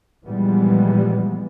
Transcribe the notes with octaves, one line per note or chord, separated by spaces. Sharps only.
A#2 E3 F3 G3 G#3 B3